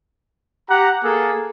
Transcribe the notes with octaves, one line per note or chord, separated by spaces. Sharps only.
G4 F#5 A#5
A#3 G#4 A4